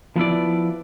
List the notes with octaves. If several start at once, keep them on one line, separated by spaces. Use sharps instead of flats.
F3 B3 E4 D5